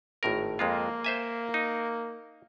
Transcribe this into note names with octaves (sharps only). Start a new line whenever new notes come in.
G#1 A2 A#4
F2 G#3 A#3 F4
C5 E5 G#5
D#4